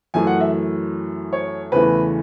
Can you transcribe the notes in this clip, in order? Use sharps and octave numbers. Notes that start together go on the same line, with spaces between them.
F#2 E3 A3 G#5
F#5
E5
C#5
E2 C#3 E3 A3 B4